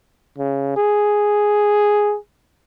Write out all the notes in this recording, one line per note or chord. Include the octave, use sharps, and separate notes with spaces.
C#3
G#4